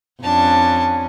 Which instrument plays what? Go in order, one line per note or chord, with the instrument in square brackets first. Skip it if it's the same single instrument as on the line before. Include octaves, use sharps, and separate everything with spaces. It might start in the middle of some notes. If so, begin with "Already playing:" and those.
[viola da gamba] F2 C#4 [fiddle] D4 A5